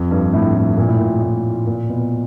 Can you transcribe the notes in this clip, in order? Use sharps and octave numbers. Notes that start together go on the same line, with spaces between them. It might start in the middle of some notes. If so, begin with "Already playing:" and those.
Already playing: F2
G2
A2
A2
A#2
A2
A#2
A2
A#2
B2